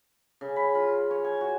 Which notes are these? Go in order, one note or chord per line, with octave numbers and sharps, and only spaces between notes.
C#3
B5
F4
C#5
G#5
F#4